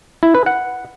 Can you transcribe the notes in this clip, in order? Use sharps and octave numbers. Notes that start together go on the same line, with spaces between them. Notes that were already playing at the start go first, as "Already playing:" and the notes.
E4
B4
F#5